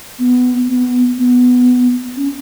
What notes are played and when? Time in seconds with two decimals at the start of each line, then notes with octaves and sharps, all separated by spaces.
0.19 B3
0.69 B3
1.18 B3
2.16 C#4